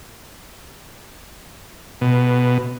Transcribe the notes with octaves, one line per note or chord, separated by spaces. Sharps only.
B2